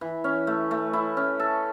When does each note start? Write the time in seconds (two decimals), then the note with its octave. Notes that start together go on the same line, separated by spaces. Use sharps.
0.01 E3
0.24 C#4
0.47 A3
0.71 A3
0.93 E4
1.17 C#4
1.39 A4